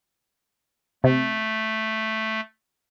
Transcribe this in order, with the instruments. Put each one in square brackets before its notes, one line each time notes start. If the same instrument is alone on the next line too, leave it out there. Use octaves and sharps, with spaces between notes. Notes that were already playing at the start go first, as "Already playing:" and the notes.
[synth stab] C3 [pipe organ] A3